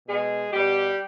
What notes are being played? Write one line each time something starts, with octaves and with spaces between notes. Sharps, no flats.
B2 G#3 G#4
B2 G3 G4